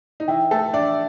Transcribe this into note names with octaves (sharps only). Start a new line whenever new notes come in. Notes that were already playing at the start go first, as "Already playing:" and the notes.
D#4
E3 E4 G5
A3 A4
D4 D5 E5